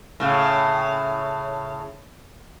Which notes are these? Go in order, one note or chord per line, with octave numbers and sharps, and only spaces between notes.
A2 C#3